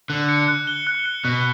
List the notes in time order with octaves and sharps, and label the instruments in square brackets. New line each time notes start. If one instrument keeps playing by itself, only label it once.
[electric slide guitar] D3 [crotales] F#6
[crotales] C#7
F#6
G7
F#6
C#7
[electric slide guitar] B2 [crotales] F#6